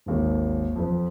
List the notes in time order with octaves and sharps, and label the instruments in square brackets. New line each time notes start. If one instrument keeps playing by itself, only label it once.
[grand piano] G#1 D#2 G#2
F2 F3